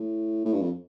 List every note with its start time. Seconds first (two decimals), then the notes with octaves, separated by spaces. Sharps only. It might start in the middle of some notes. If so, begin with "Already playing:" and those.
Already playing: A2
0.45 A2
0.54 G2
0.62 F2